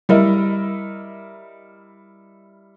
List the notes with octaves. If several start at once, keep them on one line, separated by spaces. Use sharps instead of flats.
G3 E4 A#4 D#5 E5